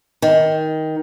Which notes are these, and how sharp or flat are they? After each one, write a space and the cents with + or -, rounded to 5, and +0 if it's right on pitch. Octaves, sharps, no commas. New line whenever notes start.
D#3 +15